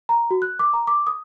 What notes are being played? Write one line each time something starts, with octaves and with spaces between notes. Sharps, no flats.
A#5
F#4
F#6
D6
A#5
D6
D#6